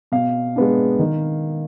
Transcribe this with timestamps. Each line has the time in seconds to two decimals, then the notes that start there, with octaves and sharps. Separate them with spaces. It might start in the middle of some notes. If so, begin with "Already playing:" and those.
0.12 B2 F5
0.56 G#3 B3 D4
0.99 D#3